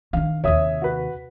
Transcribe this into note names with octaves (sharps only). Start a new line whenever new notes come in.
D#3 D4 F5
D#2 C3 C#5 E5 D#6
F#4 B4